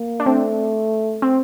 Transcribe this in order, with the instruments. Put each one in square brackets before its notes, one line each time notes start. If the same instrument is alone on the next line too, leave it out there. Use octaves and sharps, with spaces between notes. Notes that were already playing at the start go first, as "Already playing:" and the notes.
Already playing: [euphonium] A#3
[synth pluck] D4
[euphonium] A3 [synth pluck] C4
[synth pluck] C4